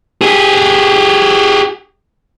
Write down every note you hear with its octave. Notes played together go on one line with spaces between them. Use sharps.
G4 G#4